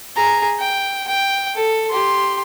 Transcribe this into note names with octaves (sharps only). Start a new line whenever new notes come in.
G#4 A#5
G5
G5
A4
G4 C6